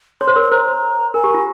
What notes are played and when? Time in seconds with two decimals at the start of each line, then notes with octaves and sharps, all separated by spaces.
0.21 C#5 C6
0.27 C5
0.36 A#4 C#5
0.42 C6
0.52 C5 A#5
1.14 A#4 G#5
1.24 G4
1.34 F4